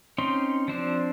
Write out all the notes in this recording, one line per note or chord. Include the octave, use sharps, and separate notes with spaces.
C4 C#4 D#4 C6
F3 C4 D4